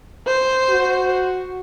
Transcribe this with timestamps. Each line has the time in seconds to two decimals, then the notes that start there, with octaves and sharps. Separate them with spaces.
0.27 C5
0.70 F#4